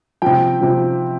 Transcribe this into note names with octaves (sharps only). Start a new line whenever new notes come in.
C3 F3 G5
C3 F3